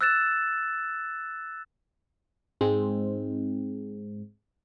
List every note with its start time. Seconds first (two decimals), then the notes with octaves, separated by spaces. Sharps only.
0.01 E6 F#6 A6 E7
2.61 G#2 G#3 C4